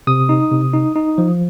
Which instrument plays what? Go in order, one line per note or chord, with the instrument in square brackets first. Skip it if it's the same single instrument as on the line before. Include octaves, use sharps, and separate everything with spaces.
[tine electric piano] C3 D#6
D#4
C3
D#4
D#4
F3